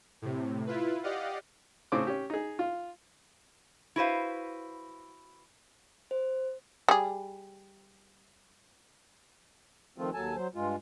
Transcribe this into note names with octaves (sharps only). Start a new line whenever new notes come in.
A2 C3
E4 F4 B4
G4 D5 D#5 F5 F#5
A2 C#3 C4 D6
C#4 G4
D#4 G#4
F4
E4 F#4 B4 C5 F5
C5
G3 G#4
D#3 F3 A3 C4 F4
D#2 F#3 A4 G#5 A5
F#3 C5
G2 G#3 F4